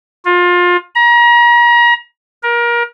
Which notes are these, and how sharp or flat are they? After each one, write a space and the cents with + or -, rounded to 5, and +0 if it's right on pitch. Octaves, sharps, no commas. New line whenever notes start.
F4 +25
A#5 +35
A#4 +25